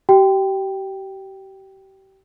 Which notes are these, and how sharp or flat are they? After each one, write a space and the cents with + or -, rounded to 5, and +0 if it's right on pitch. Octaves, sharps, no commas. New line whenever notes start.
G4 -35 G5 +0